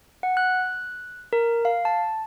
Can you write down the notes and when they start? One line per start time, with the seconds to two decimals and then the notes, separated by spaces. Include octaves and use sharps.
0.23 F#5
0.37 F#6
1.33 A#4
1.65 F5
1.85 A5